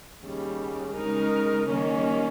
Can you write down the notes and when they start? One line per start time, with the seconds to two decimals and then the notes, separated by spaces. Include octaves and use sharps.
0.22 D#2 C#3 G3
0.96 C#3 G#3 D#4 A#4
1.69 D#3 G3 A#3 C#4